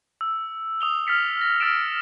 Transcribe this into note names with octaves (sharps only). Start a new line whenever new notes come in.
E6
D#6 F7 G7
F6 A6 B6 C#7
A#6
E6 F6 A6 B6 D7 E7